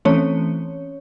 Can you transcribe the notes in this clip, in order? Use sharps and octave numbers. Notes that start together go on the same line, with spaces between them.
E3 A3 C4 C#4 C#5